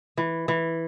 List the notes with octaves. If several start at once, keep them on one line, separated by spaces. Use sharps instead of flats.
E3
E3